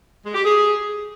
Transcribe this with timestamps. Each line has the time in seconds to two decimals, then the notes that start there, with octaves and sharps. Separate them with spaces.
0.24 G#3
0.34 G4
0.45 G#4